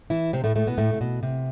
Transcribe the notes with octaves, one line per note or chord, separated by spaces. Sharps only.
E3 E4
C3 C4
A2 A3
A2 A3
B2 B3
A2 A3
C3
B2
C3